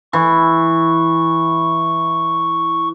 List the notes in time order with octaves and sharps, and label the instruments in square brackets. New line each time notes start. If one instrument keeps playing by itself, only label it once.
[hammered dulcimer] E3 [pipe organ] C#6